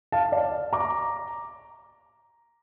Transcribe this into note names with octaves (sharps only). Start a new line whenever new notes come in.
F5 A5
D5 F5
A#5 D6